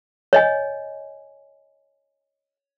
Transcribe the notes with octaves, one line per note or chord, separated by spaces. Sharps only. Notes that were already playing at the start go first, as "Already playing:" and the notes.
C#5 D#5 G#5